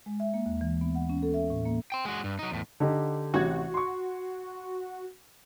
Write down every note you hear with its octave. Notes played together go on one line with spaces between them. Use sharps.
G#3
E5
A#3
D#2
E3
B3
F#5
C#4
A4
E5
A2
A#3
G5 C6
G#3 F#4
G2
F#3 D#4
E2 A2
D3 D#4 G4
A1 C3 F#4 G#6
C6 C#6